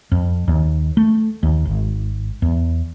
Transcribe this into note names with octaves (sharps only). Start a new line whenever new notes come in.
F2
D#2
A3
D#2
G#1
E2